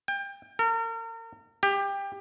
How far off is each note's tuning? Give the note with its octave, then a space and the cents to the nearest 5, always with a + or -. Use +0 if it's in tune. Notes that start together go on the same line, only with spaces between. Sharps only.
G5 +25
A#4 -40
G4 +20